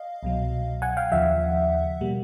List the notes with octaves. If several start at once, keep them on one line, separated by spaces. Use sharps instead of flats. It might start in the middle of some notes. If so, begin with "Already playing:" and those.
Already playing: D#5 F5
C2 B2 F#3
F#5 G#5
F5 G5
D#2 C#3 F3 E5 F#5
B2 G3 A#3